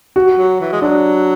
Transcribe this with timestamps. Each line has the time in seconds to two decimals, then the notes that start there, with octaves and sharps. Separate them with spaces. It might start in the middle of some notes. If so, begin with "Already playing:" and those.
0.16 F#4
0.38 F#3
0.60 E3
0.72 G#3
0.82 F#3 D4